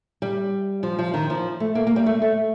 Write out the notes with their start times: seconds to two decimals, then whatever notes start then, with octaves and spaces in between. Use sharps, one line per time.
0.22 G3
0.83 F3
0.99 F3
1.14 D#3
1.30 F3
1.60 A3
1.75 A#3
1.87 A#3
1.96 G3
2.06 A3
2.22 A3